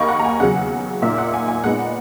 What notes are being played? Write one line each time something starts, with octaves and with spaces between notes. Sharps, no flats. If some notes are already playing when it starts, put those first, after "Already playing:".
Already playing: D#2 D#3 A#3 D#4 B5 C#6
F#5
A#5
G#5
E2 C#3 F#3 F#5
A#2 A#3 D#4 E5
F#5
G#5
G#5
A#2 G#3 B3 D#4 F#5